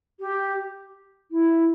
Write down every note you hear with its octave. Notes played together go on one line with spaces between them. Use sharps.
G4
E4